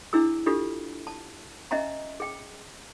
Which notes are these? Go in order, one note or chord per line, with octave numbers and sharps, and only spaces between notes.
D4 E4 G#4 E6
D4 F4 G4 A4
A5
C#4 D#5 E5 G#5 A#5
G#4 G5